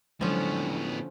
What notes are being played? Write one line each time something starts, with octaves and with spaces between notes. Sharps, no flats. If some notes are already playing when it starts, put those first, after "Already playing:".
A2 D3 F3 F#3 G#3 B3 C#4